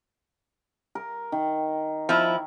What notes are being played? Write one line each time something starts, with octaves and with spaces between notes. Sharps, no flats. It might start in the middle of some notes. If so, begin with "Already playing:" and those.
A#4
D#3
F3 E4